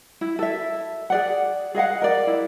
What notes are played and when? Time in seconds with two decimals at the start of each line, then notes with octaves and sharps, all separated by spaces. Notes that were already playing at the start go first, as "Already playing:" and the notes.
0.21 E4
0.39 A4 E5
1.10 G#4 D5 F#5
1.75 G#4 D#5 F5 F#5
2.02 A#4 D5
2.27 E4